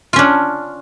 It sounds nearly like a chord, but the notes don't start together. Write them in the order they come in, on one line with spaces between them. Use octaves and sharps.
F4 C#4 D4